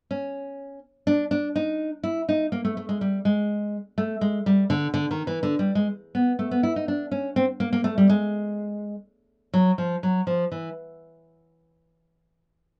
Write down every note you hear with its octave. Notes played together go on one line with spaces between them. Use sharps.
C#4
D4
D4
D#4
E4
D#4
A#3
A3
A3
G#3
G3
G#3
A3
G#3
G3
D3
D3
D#3
E3
D3
G3
G#3
B3
A3
B3
E4
D#4
D4
C#4
C4
A#3
A#3
A3
G3
G#3
F#3
F3
F#3
F3
E3